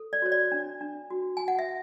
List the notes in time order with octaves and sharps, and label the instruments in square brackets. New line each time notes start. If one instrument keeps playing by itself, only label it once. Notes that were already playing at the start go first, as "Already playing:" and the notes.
Already playing: [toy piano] A4
D5
F#4 C#5
D5
D4
D4
F#4
F#4 G#5
F#5
E5